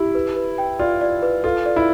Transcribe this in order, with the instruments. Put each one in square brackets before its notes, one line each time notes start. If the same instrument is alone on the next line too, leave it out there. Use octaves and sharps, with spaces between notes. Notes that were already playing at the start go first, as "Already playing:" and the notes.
Already playing: [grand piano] E4 [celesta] G4
[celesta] B4
B4
G5
[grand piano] F4 [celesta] D5
[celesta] D5
B4
[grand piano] F4 [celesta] A4
[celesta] D5
[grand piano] E4